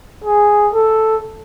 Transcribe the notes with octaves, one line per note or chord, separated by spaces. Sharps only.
G#4
A4